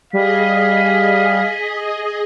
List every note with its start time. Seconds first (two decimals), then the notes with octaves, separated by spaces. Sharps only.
0.13 G3 G#4 D#5 F5 B6